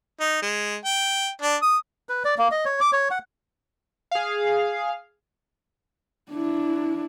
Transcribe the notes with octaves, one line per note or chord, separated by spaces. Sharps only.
D#4
G#3
G5
D4
D#6
B4
D5
A#3
D#5
C#5
D6
C#5
F#5
G#4 F5
D4 E4